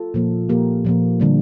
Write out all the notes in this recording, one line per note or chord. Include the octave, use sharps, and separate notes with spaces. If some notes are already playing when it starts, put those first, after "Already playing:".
Already playing: F4 A4
A#2 F3 A#3
A#2 F3 A#3 G4 A#4
A#2 F3 A#3
D3 G3 A#3